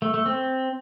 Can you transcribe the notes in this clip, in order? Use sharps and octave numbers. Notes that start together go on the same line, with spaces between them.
A3
A3
C4